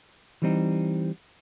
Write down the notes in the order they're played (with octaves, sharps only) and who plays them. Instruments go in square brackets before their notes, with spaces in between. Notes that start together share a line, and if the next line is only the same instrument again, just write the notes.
[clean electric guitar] E3 G3 C4 D#4